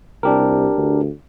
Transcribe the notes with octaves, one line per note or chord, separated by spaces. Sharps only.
C2 D4 G4 A#4
D2